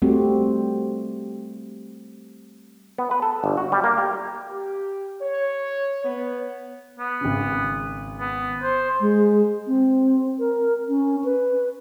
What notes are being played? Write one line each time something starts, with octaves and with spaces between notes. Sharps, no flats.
G3 A3 C4 F#4 G4
B3
B4
A4
G1
F#4
G3
A#3
G4
G4
C#5
B3
B3
G#1 C#3
B3
C5
G#3
C4
A#4
C#4
B4